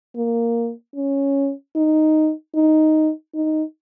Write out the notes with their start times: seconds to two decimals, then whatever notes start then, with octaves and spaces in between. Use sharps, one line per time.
0.16 A#3
0.96 C#4
1.76 D#4
2.55 D#4
3.35 D#4